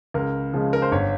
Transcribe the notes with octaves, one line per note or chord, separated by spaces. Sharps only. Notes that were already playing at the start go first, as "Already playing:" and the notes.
C#2 A#4
C#3 F3 G#3
A#4
C5
G1 C#5